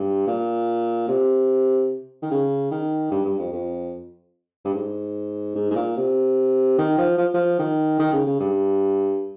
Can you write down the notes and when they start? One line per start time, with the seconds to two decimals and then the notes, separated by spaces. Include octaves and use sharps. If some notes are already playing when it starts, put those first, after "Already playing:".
Already playing: G2
0.27 A#2
1.08 C3
2.22 D#3
2.31 C#3
2.71 D#3
3.11 G2
3.25 G2
3.39 F2
3.53 F2
4.65 G2
4.74 G#2
5.55 G#2
5.71 G#2
5.75 A#2
5.97 C3
6.78 D#3
6.98 F3
7.18 F3
7.34 F3
7.59 D#3
7.99 D#3
8.13 C#3
8.27 C#3
8.40 G2